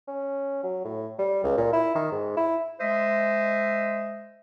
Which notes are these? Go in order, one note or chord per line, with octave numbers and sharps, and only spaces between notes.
C#4
F#3
A2
G3
C#2
A#2
E4
D#3
G#2
E4
G#3 C5 D#5 E5